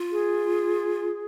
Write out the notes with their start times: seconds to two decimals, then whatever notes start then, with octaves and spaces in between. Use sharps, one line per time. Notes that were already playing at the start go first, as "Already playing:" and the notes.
Already playing: F4
0.12 G#4